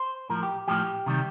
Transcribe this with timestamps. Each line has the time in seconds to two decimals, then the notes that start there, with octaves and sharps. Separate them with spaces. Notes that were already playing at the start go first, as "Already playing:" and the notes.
Already playing: C5
0.30 A2 F3 A#4
0.43 G4
0.68 A2 F3 G4
1.06 C3 D#3 G3